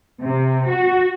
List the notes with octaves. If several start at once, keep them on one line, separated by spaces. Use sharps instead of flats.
C3
F#4